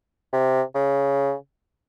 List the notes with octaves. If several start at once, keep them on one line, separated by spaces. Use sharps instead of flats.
C3
C#3